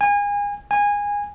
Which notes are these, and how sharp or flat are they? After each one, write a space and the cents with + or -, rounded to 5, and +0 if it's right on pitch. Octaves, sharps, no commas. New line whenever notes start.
G#5 -30
G#5 -20